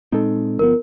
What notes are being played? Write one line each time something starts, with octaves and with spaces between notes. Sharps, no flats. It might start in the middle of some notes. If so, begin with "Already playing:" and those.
A#2 G#3 C4 D#4 A4
G1 F3 B3 A#4